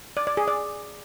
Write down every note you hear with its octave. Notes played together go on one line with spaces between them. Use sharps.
D5
D5
G#4
D5